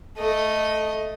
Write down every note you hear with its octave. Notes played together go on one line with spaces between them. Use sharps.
A3 D#5